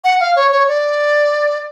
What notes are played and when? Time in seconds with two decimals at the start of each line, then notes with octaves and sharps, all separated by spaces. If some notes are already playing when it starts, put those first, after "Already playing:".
0.04 F#5
0.20 F5
0.36 C#5
0.52 C#5
0.68 D5